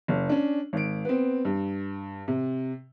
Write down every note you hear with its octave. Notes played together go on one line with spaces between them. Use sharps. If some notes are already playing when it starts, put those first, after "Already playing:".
F#1
C#4 D4
G#1 D7
B3 C4
G2
C3